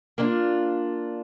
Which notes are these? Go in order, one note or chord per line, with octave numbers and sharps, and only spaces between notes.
A#3 D4 F4